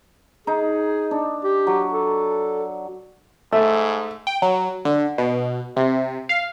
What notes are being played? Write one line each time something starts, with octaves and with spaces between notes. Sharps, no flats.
D#4 G#4
D4
G4
F#3
A4
G#2 A3 E5
G5
F#3
D3
B2
C3
F5